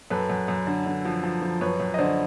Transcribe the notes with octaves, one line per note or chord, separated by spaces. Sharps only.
F#2 A4 B4
F#2
F#2
D3
D3
F3
F3
F3
F#2 B4 C#5
F#2
D#5
D3 C5 D5